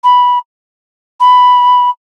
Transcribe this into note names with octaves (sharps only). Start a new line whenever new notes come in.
B5
B5